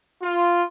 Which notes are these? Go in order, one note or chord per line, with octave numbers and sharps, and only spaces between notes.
F4